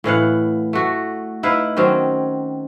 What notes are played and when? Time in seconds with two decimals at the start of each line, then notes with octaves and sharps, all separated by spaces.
0.04 A2 E3 F5 F#5
0.73 A3 F#4
1.43 D#4 E4 B4 F5
1.77 D#3 F#3 C4 C#4